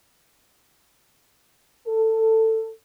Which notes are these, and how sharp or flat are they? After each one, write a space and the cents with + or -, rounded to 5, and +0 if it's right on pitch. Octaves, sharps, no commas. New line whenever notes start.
A4 +15